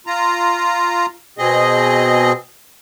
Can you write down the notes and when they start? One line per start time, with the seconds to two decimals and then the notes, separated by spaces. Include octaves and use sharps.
0.07 F4 A#5
1.38 B2 C4 G#4 D#5